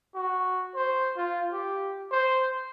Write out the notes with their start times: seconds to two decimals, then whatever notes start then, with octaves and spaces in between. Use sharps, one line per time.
0.15 F#4
0.76 C5
1.17 F4
1.53 G4
2.12 C5